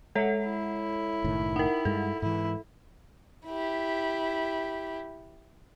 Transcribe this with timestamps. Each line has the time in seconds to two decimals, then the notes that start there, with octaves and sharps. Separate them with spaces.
0.15 G#3 A4 C#5 E5 F#5
0.45 E4
1.24 F#1 A2 D#3
1.56 D#4 A#4 F#5
1.85 G2 G#3 A4
2.22 G#2 E3 E4
3.46 E4 G4